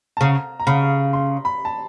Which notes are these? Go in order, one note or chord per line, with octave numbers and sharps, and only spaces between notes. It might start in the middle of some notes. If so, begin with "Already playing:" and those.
A5
C#3 A#5
A#5
C#3 B5
C6
B5
A5